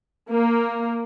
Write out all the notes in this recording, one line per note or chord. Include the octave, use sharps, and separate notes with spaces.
A#3